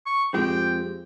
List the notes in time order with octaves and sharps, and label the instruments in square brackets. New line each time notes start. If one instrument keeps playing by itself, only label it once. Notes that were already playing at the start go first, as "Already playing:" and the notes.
[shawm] C#6
[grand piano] F2 F3 [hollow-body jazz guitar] G#3 C4 G4 [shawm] G5